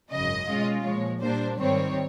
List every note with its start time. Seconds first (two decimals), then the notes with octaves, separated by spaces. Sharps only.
0.11 G#1 F#2 C#3 D#5
0.48 B2 G#3 C#4 F4
0.85 A#2 F3 G#3 C#5
1.21 A#2 G3 A#3 D4 C5
1.58 G#2 D#3 G3 C4 C#5